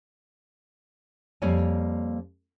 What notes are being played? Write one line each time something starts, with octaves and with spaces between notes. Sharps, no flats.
F2 G3 A#3 C#5 D5 G#5